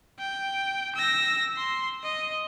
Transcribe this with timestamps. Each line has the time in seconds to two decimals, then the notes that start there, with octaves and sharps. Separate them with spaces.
0.19 G5
0.95 E6 A#6
1.57 C6
2.03 D#5